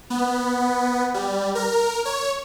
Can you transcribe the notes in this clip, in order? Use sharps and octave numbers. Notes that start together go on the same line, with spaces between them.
B3
G3
A#4
C#5